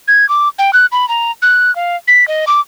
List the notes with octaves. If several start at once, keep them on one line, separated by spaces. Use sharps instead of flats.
G#6
D6
G5
F#6
B5
A#5
F#6
F5
B6
D#5
D6